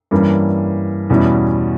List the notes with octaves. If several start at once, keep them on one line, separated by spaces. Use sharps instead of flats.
G2 E3 G3 A#3 C#4
E2 B2 G3 C#4 E4